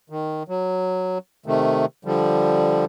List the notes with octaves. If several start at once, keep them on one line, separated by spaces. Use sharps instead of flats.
D#3
F#3
C3 D#3 A3
D3 F3 G3